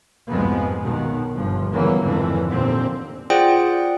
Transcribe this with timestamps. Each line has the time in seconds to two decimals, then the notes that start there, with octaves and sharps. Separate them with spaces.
0.27 C2 F2 G#2 F3 G#3 B3
0.82 B1 B2 D#3
1.35 G1 F3
1.71 E2 G2 C#3 E3 F#3 A#3
2.02 G#1 F2 A2 D3 E3
2.48 D#2 A#2 D3 C4
3.30 F4 G#4 C5 D5 F#5 G5